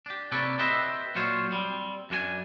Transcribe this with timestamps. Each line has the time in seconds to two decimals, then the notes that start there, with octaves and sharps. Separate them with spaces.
0.06 D4 G4
0.32 C3 A#3 A4 B4 C#5 D5
0.59 G4 A4 B4 C5 D#5 E5
1.15 A#2 F#3 F4 C5 C#5
1.52 G3 C4
2.10 F#2 D4 F#4 G#5